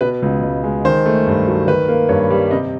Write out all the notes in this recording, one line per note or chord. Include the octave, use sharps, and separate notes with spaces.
B2 B4
C#2
C#2
G#3
D#3 C5
A3
G2
F#3
D#3 B4
A#3
G2 C#5
G3
C3 D#5